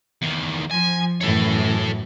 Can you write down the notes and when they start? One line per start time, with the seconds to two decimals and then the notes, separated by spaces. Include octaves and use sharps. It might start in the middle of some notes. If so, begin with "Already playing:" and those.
0.22 E2 D#3
0.71 F3 G#5
1.21 F#2 A2 E3 A4 C#5